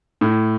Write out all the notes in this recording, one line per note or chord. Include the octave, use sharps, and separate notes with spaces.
A2